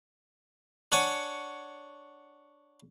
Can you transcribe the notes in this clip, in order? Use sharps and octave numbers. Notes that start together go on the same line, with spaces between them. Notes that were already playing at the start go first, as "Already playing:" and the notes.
D4 C#5 F#5 G#5